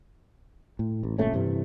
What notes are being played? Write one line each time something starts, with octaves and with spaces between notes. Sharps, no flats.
A2
A1
G1 A#2 A3 C#4
G2 C3 E3